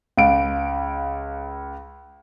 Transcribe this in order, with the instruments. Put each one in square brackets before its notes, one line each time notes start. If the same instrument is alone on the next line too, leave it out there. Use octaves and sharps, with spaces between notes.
[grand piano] C#2 D7 [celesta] F5